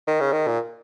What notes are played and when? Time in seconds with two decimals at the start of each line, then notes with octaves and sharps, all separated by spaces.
0.07 D#3
0.20 C#3
0.32 D#3
0.47 A#2